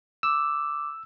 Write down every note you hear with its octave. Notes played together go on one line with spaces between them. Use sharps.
D6 E6